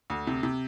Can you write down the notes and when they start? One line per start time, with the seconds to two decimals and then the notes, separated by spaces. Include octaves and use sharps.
0.10 D2
0.27 C3
0.43 C3